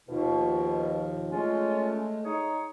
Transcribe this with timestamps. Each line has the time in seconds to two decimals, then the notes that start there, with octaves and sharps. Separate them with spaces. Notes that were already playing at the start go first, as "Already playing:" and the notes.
0.09 D#2 B2 D#3 F3
1.32 G#3 A3 C#4 F4
2.25 D#4 G#4 C#5